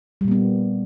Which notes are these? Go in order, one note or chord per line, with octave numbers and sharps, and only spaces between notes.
A#2 G3 A#3 B3